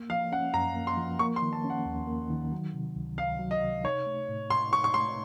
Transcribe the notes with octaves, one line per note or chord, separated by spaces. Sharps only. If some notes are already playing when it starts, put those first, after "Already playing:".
Already playing: A#3
F3 F5
C#4 F#5
F#2 A#5
A#3
C6
F3
A#3 C#6
C6
D#3
A5
C#4
F#5
D#2
A#3
D#3
F#3
C3
C#2
C#2 F5
F#3
D#5
C3
D#4 C#5
A3
A2
A2 C6
D#4 C#6
C#6
A3 C6